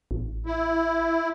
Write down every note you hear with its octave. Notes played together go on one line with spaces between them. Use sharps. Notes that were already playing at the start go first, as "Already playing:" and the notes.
A1
E4